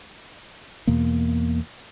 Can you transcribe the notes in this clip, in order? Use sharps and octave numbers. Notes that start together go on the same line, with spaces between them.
E2 B2 A#3